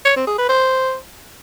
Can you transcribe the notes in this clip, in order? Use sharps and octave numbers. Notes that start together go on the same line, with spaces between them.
C#5
C4
G#4
B4
C5